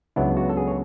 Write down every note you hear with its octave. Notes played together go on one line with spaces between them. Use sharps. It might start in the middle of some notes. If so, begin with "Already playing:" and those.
C#2 C#3 F#3 B3 D4 E4
F#4
A4
G#4
C#5